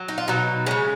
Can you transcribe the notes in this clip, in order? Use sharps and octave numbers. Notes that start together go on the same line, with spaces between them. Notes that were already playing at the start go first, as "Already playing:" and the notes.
Already playing: F#3
D#4
F4
B2 F#3 D#4
C#3 G#3 C#4